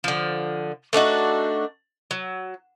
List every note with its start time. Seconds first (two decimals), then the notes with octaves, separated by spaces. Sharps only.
0.04 D3 F3
0.93 A3 D4 D#4 F#4
2.11 F#3